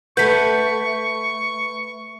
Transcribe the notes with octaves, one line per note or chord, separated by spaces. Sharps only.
A3 B4 F#5 C#6 G6 B6